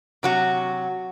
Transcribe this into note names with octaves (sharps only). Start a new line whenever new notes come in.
C3 F#3 F#4